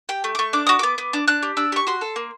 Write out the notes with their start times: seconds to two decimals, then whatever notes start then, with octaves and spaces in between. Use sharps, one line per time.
0.09 G4 G5
0.24 A3
0.35 D6
0.39 A3 C#6
0.53 D4 D6
0.67 F#4 D#6
0.79 B3 D6
0.98 B3
1.13 D4
1.28 D4 F#6
1.43 G4
1.57 D4 E6
1.72 G4 C#6
1.87 F#4 C6
2.01 A4
2.16 A#3